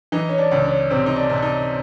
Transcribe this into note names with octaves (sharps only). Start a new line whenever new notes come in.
E3 D#4
C#4
D4
C#2
C#4
C3 C4
D#4
D4
C3
D4
D#4